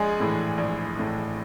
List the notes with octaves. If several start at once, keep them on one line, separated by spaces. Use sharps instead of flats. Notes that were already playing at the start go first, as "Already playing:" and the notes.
Already playing: A#1 G#3 G#4
A2 E3
A#1
A2 E3